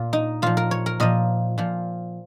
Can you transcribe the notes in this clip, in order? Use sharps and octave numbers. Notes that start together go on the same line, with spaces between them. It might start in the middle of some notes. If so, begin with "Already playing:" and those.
Already playing: A#2 F4
D#4
A#2 F3 F4
A#4
C#5
A#4
A#2 F3 D#5
A#2 F3